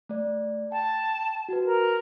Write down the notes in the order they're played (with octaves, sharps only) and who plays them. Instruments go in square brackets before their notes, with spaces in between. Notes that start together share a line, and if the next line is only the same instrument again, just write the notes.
[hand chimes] A3 D5
[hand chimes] G5 [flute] A5
[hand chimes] F#4 B4
[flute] A#4